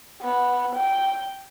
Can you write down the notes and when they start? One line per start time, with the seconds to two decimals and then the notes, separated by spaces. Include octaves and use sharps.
0.22 B3
0.76 G5